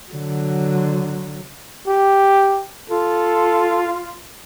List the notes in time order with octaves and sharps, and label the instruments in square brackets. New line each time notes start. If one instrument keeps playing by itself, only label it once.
[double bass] D3 F#3
[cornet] G4
[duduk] F4 [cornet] A4